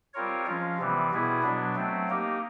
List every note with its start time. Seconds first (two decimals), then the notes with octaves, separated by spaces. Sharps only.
0.14 G3 C4 F4 A#4 C#5
0.46 F3 G#3 C#4 F4
0.78 C3 E3 G3 B3
1.11 B2 G3 B3 E4 G#4
1.43 B2 F#3 B3 D4
1.75 F#3 A3 C4
2.09 A#3 D#4 G4